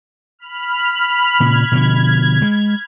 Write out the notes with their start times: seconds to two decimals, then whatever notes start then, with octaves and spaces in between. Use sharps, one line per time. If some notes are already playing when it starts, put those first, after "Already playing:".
0.39 B5 F6
1.40 A#2 C#3 G#6
1.72 B2 D3 F3
2.42 G#3